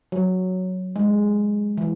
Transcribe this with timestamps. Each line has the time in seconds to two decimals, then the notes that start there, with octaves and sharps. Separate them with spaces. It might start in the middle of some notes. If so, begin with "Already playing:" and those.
0.12 F#3
0.96 G#3
1.77 E3